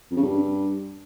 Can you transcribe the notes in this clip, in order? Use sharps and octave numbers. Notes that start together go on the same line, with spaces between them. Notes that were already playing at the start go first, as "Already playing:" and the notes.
F2
C#3
G2